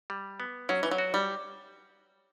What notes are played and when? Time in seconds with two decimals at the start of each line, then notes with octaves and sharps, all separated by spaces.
0.10 G3
0.40 B3
0.69 F#3 C#4
0.83 E3
0.91 F#3
0.98 F#4
1.14 G3